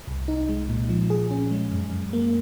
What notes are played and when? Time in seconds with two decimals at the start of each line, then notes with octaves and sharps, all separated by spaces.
0.07 C2
0.28 D#4
0.49 G#3
0.69 A#2
0.89 F3
1.10 G#4
1.31 C#4
1.51 G#3
1.71 F#2
1.92 F#2
2.13 A#3